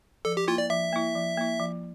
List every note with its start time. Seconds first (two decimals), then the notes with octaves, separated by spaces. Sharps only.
0.25 F3 A4
0.37 G4
0.48 A#3 E4 F4
0.58 D5
0.70 F3 E5
0.93 A#3 E4
1.15 F3
1.37 A#3 E4
1.60 F3